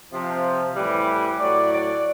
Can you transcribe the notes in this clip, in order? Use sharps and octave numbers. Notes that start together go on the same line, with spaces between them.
C3 F3
A2 E3 G3
A2 F#3 D5
D5